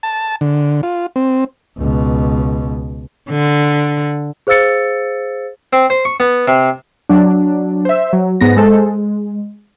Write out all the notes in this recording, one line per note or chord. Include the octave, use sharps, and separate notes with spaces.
A5
D3
F4
C4
C#2 B2
D3
G#4 C5 F5 E6 A6 C#7
C4
C5
C#6
B3
C3
F#3 D4
C5 E5
F#3
G#2 B3 A#6
G#3 A4 C5
G#3